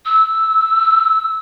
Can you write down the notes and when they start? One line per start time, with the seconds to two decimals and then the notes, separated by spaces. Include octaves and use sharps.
0.05 E6